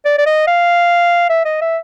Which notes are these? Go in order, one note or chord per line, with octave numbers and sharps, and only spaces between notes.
D5
D5
D#5
F5
E5
D#5
E5